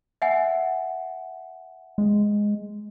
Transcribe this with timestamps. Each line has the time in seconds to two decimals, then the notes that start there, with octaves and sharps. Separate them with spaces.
0.22 E5 F#5 G#5
1.98 G#3